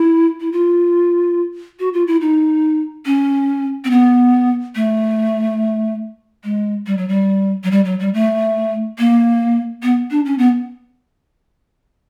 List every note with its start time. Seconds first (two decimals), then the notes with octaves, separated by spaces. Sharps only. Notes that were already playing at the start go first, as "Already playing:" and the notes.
Already playing: E4
0.41 E4
0.52 F4
1.79 F#4
1.93 F4
2.07 E4
2.21 D#4
3.06 C#4
3.85 C4
3.90 B3
4.76 A3
6.44 G#3
6.87 G3
6.97 F#3
7.08 G3
7.64 F#3
7.71 G3
7.85 F#3
8.00 G3
8.14 A3
8.98 A#3
9.83 B3
10.11 D4
10.25 C#4
10.38 B3